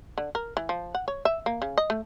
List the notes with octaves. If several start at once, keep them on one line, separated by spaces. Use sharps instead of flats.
D3
A#4
E3
F3
F#5
C#5
E5
A#3
C#3
D#5
A3